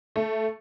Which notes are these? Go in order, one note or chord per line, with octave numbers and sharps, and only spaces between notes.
A3